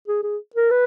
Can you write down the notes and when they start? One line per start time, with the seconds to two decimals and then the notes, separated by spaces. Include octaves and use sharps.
0.08 G#4
0.24 G#4
0.56 A#4
0.71 B4